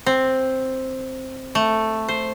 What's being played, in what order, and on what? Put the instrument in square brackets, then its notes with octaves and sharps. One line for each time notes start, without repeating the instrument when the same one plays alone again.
[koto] C4
A3
C5